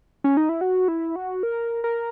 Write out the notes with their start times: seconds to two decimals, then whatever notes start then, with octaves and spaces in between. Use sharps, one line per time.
0.24 C#4
0.37 D#4
0.49 E4
0.61 F#4
0.88 E4
1.16 F#4
1.43 A#4
1.84 A#4